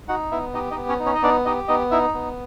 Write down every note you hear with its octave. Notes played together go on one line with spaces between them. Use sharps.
D#4 F#4 F#5
B3 E4 E5
D#4 G4 D#5
D#4 D#5
B3
C#4 C#5
D#4
C#4 C#5
D#5
B3 D4 D5
D#4 G4 D#5
B3 D#4 D#5
D#4 E4 E5
B3